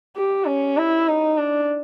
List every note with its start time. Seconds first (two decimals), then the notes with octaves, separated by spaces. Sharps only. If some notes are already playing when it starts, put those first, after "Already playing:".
0.16 G4
0.47 C#4
0.77 E4
1.08 D#4
1.38 D4